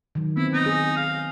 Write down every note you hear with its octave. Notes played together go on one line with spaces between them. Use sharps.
D#3 F#3
B3 C4 E4
D#4
G#4
F5